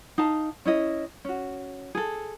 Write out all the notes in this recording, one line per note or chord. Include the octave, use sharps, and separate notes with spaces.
D#4 F5 A5
C#4 E4 D#5
C#4 F#4
G#4 A4